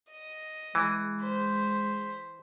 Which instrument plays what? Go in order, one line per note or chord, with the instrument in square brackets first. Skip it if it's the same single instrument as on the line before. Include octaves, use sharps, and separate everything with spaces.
[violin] D#5
[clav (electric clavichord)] E3 [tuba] G#3
[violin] C5 B6